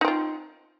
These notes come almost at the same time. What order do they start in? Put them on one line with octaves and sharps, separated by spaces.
D#4 C4 F4